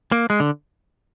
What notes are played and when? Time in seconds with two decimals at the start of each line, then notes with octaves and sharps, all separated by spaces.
0.12 A#3
0.30 G#3
0.40 D3